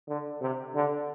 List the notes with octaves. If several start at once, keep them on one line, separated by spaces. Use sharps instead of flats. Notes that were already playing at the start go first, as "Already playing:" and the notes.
D3
C3
D3